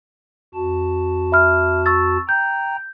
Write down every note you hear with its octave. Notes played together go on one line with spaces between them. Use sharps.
F2 F#4 A5
E5 B5 F6
C#6 E6 A6
G5 A#5 G6